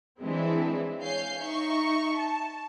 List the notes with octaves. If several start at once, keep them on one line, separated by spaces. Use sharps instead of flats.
E3 G#3 C4 D4 E4
C#5 F5 G#5 G6 C7
D#4 E5 C#6
A5